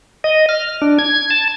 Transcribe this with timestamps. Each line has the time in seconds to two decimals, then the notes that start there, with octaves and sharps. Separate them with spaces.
0.24 D#5
0.49 F6
0.82 D4
0.98 G#6
1.30 A5